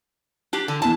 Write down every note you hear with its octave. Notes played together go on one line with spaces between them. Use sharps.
D4 G4
D3
E2 E4 A5